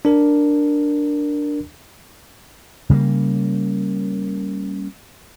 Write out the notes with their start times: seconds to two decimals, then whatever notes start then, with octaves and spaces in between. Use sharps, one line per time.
0.05 D4 A#4
2.90 C#3 G3 A3 A#3